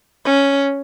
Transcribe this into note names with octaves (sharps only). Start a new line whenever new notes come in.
C#4